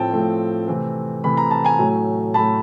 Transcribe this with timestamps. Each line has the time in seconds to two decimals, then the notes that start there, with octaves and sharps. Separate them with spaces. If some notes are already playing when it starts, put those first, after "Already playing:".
Already playing: A2 F3 A3 C4 G5 A5
0.13 A2 F3 A3 C4
0.67 C3 E3 A3 C4
1.23 C3 E3 A3 C4 B5
1.37 A#5
1.51 A5
1.65 G#5 A#5
1.79 A2 F#3 A3
2.34 A2 F#3 A3 A5 B5